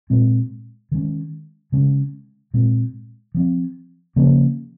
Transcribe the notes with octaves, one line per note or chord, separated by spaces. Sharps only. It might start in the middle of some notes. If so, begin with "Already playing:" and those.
A#2 G#3 C4
D#3 G#3 C#4
C#3 G#3 C#4
A#2 G#3 C4
F3 C4
C#3 F3 A#3 C#4